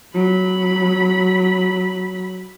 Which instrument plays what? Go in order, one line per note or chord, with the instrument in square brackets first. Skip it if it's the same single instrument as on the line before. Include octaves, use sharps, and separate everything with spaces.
[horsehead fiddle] F#3 B5